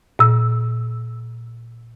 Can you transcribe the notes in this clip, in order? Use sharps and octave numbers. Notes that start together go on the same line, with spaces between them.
A#2 E6